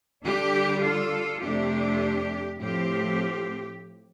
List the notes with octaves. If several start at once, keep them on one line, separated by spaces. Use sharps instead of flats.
D3 G3 D4 G4
F4 A4
F2 C3 A3 D4 G4
A2 F3 C4 G4